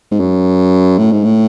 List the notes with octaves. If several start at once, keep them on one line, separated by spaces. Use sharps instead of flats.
G#2
F#2
A2
G#2
A2